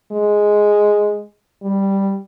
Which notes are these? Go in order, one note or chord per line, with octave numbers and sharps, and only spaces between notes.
G#3
G3